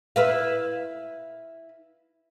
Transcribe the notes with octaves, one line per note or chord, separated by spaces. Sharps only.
E4 B4 F5